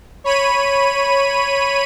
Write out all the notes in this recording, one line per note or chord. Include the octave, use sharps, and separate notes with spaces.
C#5 B5 D#7